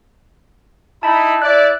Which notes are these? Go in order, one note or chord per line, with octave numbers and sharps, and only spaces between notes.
D#4 E4 A5 B5
E4 D5 F#6